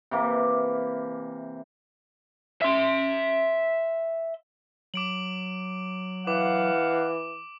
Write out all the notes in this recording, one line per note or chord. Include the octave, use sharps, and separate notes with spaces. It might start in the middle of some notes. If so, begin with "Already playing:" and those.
C3 E3 A#3
E5 C6
F#3 D6 D7 F#7
E3 F5 F#5 D6